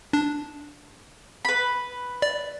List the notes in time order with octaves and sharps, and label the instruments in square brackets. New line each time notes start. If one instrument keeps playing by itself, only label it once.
[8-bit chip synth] D4
[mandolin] B4 B5
[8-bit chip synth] D5